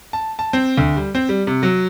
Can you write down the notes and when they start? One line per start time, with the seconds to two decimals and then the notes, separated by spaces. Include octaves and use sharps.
0.13 A5
0.39 A5
0.53 C4
0.77 D2
0.96 G3
1.15 C4
1.29 G3
1.47 C3
1.63 F#3